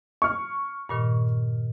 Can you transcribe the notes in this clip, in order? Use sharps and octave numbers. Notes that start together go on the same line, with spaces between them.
C#6 F6
G2 A#2 D#3